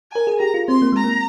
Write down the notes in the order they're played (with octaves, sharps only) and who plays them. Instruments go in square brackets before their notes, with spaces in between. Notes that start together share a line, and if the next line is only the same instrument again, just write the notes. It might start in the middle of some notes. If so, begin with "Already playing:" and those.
[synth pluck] A#4 [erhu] G#5
[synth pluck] G#4
[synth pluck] G4 [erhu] A#5
[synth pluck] F4
[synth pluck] C4 [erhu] C6
[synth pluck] A#3
[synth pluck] G#3 [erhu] A#5
[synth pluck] A#3